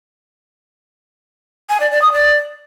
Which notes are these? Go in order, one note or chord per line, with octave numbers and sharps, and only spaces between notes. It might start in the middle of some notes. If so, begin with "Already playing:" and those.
G#5
D5
D5
D#6
D5